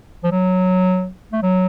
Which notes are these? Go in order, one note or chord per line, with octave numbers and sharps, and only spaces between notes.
F3
F#3
A3
F#3